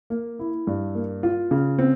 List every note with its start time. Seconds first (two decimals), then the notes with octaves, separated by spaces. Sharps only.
0.10 A#3
0.39 E4
0.67 G2
0.95 A#3
1.23 F4
1.51 C#3
1.79 C4